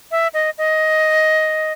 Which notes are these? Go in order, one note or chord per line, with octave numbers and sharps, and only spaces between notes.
E5
D#5
D#5